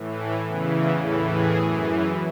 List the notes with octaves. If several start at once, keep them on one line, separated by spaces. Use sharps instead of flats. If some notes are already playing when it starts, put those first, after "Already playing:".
Already playing: A2 E3
E2 C#3 E3
A2 E3 A4
G#4
F#2 E3